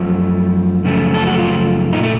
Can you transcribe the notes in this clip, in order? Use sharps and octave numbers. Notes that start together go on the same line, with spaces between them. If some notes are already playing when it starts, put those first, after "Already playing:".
Already playing: F#2 F3 A3
F#2 C#3 F3 A3
A4
F#4
F4
A#2 A3 D#4
A3